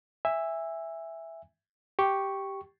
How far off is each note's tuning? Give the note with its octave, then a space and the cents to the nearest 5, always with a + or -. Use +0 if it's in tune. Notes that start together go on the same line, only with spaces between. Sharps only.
E5 +0 G#5 -25
G4 -5 C#6 +0